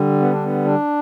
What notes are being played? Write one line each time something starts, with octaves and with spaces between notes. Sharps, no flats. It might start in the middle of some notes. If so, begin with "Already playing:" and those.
Already playing: D3 G3
B3
D4
B3
D4